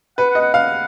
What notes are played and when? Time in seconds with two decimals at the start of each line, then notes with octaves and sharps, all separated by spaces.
0.18 B4 F#5
0.30 F#5
0.35 D#5
0.41 F#5
0.54 F5 F#5